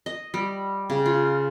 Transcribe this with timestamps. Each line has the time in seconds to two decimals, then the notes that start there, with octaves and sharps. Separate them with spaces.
0.06 D#5
0.34 G3
0.90 C#3
1.06 F4